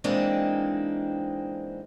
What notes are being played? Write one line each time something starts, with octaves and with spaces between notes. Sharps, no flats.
E3 G#3 A#3 C4 D4 D#4